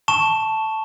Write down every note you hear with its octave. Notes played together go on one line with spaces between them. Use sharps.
A5 C#6 E7